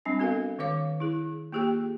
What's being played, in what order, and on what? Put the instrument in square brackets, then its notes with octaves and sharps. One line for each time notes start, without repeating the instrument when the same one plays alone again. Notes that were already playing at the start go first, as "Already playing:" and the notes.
[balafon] G3 C4 D4 G#5
B3 F#4 A4 A#4 F5
D#3 B4 C#5 F5 D6
E4 G#4
A#3 F4 G4 G#4 G5